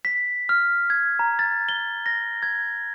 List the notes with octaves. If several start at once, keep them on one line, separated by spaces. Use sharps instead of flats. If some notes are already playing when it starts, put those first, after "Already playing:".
B6
F6
G#6
A#5
A6
G7
A#6
G#6